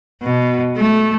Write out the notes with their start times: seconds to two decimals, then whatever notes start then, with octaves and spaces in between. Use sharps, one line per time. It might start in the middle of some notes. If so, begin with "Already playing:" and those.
0.23 B2
0.76 A3